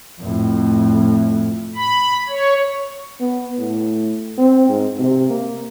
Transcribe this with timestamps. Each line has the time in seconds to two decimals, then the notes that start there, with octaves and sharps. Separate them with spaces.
0.21 F2 A2
1.76 B5
2.28 C#5
3.20 B3
3.59 A2
4.38 C4
4.69 G#2
4.99 C3
5.30 A#3